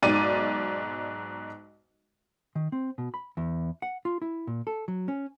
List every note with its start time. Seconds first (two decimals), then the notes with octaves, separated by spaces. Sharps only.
0.02 B1 G#2 D5 D#7
2.55 D#3
2.72 C4
2.98 B2
3.14 B5
3.37 E2
3.82 F#5
4.05 F4
4.22 E4
4.47 A#2
4.67 A4
4.88 F#3
5.08 C#4